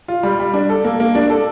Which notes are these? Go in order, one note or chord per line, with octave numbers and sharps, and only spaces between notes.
F4
G3
G3
D4
A4
A#3
A#3
D4
A4